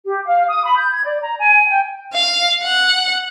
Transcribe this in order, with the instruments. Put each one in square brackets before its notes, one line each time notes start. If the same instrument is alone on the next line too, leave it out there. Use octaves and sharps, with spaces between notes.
[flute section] G4
F5
D#6
B5
G6
G#6
D5
A#5
G#5
G5
[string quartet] F5
F#5